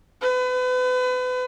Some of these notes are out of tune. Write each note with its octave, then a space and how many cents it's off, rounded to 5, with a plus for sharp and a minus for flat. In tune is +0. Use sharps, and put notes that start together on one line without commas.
B4 +35